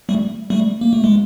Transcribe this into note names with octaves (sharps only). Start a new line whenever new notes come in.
G3 A3
G3 A3
A#3
A3
G#3